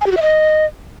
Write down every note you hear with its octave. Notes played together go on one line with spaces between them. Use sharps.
G#5
G4
F#4
E5
D#5